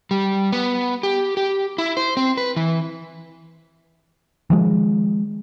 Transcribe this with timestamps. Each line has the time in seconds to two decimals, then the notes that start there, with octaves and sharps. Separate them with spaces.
0.11 G3
0.52 B3
1.03 G4
1.37 G4
1.78 E4
1.97 C5
2.17 C4
2.37 B4
2.56 E3
4.50 D#3 F3 G#3